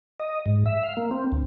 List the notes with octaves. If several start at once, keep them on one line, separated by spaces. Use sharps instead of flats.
D#5
G#2
E5
F5
A#3
C4
D2